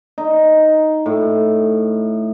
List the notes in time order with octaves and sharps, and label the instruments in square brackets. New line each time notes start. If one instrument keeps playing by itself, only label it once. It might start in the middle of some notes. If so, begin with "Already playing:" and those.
[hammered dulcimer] D#4
A2